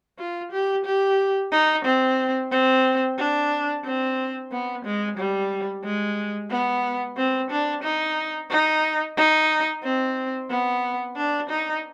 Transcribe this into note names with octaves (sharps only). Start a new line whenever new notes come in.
F4
G4
G4
D#4
C4
C4
D4
C4
B3
G#3
G3
G#3
B3
C4
D4
D#4
D#4
D#4
C4
B3
D4
D#4